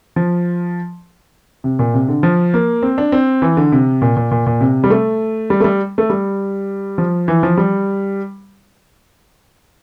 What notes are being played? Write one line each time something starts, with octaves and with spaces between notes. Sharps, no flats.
F3
C3
A#2
C3
D3
F3
A#3
C4
D4
C4
E3
D3
C3
A#2
A#2
A#2
A#2
C3
G3
A3
G3
A3
G3
A3
G3
F3
E3
F3
G3